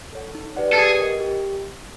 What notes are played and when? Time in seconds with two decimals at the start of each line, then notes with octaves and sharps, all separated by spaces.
0.13 A4 C#5 F#5
0.35 D#4
0.56 G4 B4 D5 F#5
0.73 A4
0.78 G4 G#4
0.99 A#4 D#5
1.20 G4